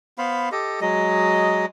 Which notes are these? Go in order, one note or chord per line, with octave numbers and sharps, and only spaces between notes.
B3 C5 F5 B5
G4 A4 D#5
F#3 G#3 D#5